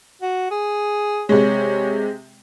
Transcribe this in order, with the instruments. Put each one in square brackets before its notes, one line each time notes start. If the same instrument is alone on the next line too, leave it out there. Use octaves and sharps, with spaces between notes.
[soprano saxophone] F#4
G#4
[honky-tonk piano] C3 G#3 [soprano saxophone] C#5